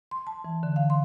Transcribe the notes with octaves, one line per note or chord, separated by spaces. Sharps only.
C6
A5
E3
D3
F5
C6